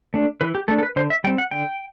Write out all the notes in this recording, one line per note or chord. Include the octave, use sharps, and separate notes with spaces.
A3 D4
E3 B4
G4
A3 D4 A4
A4
B4
D3 C5
E5
G3 C4 G5
F#5
D3 G5